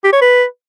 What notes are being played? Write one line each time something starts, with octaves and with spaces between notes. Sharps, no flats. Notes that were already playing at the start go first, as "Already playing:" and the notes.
G4
C#5
B4